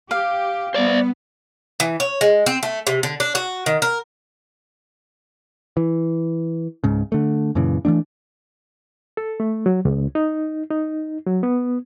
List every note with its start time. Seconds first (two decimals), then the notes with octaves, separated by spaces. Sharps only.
0.11 G4 F5
0.74 G3 B3 C5 D5
1.80 E3
2.00 C#5
2.21 G#3
2.46 C4
2.63 A3
2.87 C3
3.03 D3
3.20 D4
3.35 F#4
3.66 D#3
3.82 A#4
5.77 E3
6.84 C#2 G#2 C#3
7.12 D3 A3
7.55 F#2 A#2 C#3 E3
7.85 E3 F#3 A3 D4
9.17 A4
9.40 A3
9.66 F#3
9.85 C#2
10.15 D#4
10.71 D#4
11.26 F#3
11.43 B3